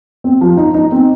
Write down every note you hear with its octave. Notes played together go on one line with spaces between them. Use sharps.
C4
F3
D#4
D#4
C4